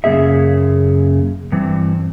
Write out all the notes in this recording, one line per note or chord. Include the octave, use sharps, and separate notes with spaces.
F#2 C#3 A#3 G#4 E5
G2 E3 C4